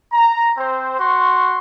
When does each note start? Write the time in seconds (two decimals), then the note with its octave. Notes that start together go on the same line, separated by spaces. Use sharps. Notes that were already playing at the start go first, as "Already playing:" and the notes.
0.12 A#5
0.58 C4 C5
0.99 F#4 C6 C#6